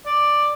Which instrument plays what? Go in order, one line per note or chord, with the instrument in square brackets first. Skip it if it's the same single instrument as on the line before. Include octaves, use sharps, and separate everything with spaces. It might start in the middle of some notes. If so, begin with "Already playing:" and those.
[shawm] D5